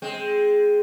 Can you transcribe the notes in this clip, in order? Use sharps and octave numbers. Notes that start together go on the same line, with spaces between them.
G#3 C4